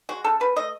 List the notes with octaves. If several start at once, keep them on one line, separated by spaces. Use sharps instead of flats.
G#3 F#4
C#3 A4
C#3 B4
A3 D#5